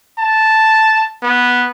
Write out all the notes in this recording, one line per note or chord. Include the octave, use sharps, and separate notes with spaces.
A5
B3